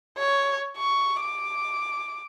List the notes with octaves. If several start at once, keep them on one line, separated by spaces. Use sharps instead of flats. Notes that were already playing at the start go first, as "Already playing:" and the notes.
C#5
C#6
D6